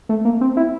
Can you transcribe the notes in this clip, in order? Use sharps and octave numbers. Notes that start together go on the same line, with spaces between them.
A3
A#3
C4
E4